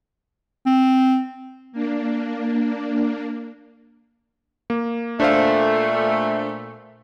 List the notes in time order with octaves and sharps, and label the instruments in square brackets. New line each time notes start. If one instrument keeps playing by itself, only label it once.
[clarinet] C4
[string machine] A#3 D4
[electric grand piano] A#3
[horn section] A#2 A3 [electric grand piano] D4 C5 F5